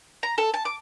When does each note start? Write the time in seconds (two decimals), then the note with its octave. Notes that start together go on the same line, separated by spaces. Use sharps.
0.23 A#5
0.38 A4
0.54 A5
0.65 D6